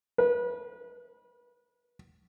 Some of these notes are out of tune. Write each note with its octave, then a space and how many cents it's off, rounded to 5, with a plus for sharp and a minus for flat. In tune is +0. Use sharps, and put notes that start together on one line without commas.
B4 -30